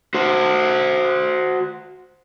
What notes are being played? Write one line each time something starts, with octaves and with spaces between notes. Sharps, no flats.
F#4 C5